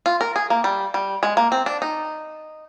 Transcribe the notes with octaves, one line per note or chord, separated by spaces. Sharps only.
F4
A#4
G#4
A#3
G3
G3
G#3
A#3
C4
D4
D#4